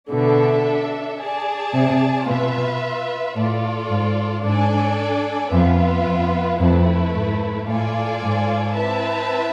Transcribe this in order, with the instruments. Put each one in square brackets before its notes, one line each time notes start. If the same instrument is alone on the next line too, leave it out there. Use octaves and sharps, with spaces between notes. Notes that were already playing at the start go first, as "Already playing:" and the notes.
[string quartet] B2 D3 [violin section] D4 A4 E5
[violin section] G#4 D5 A5
[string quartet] C3
[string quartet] B2 [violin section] F4 B4 E5
[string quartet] A2 [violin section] F4 A4 D5
[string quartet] G#2
[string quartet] G#2 [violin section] D4 A4 D5 G#5
[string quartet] F2 [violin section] B3 F4 B4 E5
[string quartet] F2
[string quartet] F2 [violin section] A3 E4 B4
[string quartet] G#2
[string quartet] A2 [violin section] F4 A4 D5 G#5
[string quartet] G#2
[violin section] C4 E4 B4 E5 A5